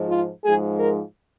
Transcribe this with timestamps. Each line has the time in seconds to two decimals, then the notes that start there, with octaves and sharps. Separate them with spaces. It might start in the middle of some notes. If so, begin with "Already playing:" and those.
Already playing: G#2 F3 G#3
0.08 F4
0.44 G#2 F3 G#3 G#4
0.79 A#4